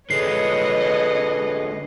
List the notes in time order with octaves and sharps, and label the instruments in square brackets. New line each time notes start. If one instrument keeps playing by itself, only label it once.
[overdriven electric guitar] D3 G#3 [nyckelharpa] B4 [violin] C#5 D#5 [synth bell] C7